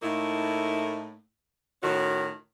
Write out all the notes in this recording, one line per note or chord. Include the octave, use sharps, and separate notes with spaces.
A2 A3 A#3 D#4 E4
A2 D#3 C#4 F#4